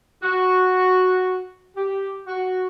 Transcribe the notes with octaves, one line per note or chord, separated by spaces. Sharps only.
F#4
G4
F#4